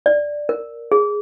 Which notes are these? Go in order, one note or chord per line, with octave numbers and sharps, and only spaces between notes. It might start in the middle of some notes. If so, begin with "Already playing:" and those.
D5
A#4
G#4